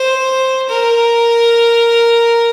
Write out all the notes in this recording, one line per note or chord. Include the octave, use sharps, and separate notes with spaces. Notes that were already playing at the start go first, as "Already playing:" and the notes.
Already playing: C5
A#4